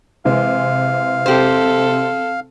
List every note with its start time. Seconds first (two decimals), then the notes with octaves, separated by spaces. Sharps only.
0.25 C3 E3 G#3 F5
1.26 C4 G4 A4 C5